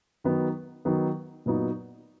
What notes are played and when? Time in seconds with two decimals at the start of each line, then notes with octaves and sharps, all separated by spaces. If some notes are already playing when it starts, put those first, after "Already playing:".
0.24 D#3 F#3 B3 D#4
0.85 D#3 F#3 B3 D#4
1.46 A#2 F#3 B3 D#4